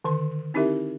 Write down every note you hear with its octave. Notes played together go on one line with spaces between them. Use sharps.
D3 D#3 C6
C4 D#4 E4 G4 A#4 E5